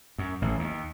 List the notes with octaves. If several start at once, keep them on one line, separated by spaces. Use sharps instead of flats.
F#2
A1
D#2